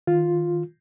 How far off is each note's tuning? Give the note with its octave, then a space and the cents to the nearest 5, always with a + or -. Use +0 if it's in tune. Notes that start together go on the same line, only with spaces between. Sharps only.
D#3 +15 F4 +0